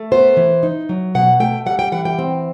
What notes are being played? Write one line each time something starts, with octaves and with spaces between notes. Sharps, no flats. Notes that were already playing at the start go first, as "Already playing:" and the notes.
Already playing: A3
B3 C5
E3
D#4
F#3
B2 F#5
A3 G5
G3 F#5
G5
E3 F#5
G5
C4